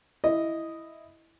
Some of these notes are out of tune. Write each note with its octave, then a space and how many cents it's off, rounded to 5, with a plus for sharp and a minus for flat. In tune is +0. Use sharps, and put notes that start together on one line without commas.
E4 +0 D#5 +0